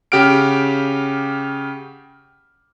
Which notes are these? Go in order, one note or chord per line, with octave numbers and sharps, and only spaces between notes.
C#3 G4 F#5 F6 D7